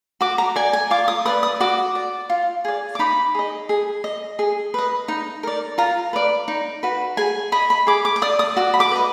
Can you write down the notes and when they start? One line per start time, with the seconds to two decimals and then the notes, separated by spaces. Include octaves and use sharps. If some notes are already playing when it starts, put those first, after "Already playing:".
0.21 F#4 D6
0.38 A#5
0.56 D5 G#5
0.73 G#5
0.91 F4 D6
1.08 D#6
1.25 B4 D5 D#6
1.43 D#6
1.60 F#4 D6
1.95 D5
2.30 F4
2.65 G#4 D5
2.95 D6
2.99 D#4 B5
3.35 G#4 D#5
3.69 G#4
4.04 D#5
4.39 G#4
4.74 B4 D#5
5.08 D#4
5.43 A#4 D5
5.78 F4 A#5
6.13 B4 D5
6.48 D#4
6.83 F#4 B4
7.17 G#4 G#5
7.52 D#5 B5
7.70 B5
7.87 G#4 D6
8.05 D6
8.16 D6
8.22 D5 D#6
8.39 D#6
8.56 F#4 D6
8.74 B5
8.80 D6
8.91 B4 D#5